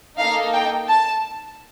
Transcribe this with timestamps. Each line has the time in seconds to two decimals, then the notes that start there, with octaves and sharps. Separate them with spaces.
0.19 A#3 D#4 A4 F5
0.53 G5
0.88 A5